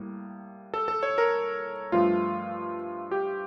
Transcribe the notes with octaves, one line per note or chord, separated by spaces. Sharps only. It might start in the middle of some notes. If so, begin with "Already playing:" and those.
Already playing: A2 G3 A#3
A4
A4
C#5
A#4
G2 F3 A3 F4
G4